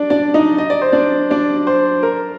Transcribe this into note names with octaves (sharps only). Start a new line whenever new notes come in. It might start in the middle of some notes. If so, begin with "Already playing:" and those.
Already playing: D4 D5
D4 D5
D#4 D#5
D#5
D5
C5
D4 D5
D4 D5
C5
A#4